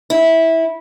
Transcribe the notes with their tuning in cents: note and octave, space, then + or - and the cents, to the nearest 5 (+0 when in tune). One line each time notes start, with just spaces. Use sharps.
E4 -15